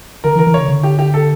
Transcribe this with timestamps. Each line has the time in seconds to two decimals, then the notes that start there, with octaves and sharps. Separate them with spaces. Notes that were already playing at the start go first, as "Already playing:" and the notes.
0.24 D3 A#4
0.35 E3
0.39 A#4
0.47 E3
0.54 C#3 C#5
0.68 D3
0.83 G4
0.99 G4
1.14 A4